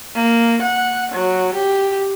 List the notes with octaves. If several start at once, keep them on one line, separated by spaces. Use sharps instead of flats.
A#3
F#5
F#3
G4